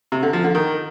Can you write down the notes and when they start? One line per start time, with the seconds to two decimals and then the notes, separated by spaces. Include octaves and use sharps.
0.12 C3
0.23 D3
0.33 F3
0.44 D3
0.55 D#3